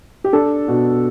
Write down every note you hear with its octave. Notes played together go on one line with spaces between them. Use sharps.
G4
D4 A4
B2